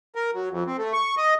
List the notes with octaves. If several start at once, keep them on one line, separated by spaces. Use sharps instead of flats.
A#4
F#3
F2
C4
A3
C#6
D#5